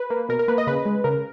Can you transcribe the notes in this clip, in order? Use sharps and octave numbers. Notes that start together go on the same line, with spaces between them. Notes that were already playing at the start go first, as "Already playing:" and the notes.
Already playing: B4
A#3
B2 A#4
A#4
A#3 B4
D#5
C#3 B4
G#3
C#3 A#4